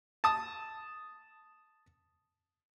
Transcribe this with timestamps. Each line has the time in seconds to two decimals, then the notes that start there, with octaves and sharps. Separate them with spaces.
0.24 A5 D#6